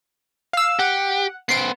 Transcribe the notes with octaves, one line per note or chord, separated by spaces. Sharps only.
F5 E6
G4 F#5
B3 C5 C7 D7